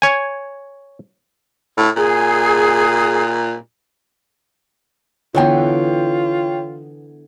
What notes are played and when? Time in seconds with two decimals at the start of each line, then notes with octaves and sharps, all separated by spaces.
0.02 C#5 G#5
1.78 A2
1.97 A#2 G#4
5.35 D3 E3 B3 F4 C#5 G5